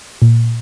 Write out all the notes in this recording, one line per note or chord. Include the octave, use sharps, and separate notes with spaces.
A#2